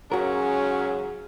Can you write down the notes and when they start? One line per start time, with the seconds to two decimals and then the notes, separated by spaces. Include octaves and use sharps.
0.12 G#2 C#3 F#3 C#4 F#4 G#4 A#4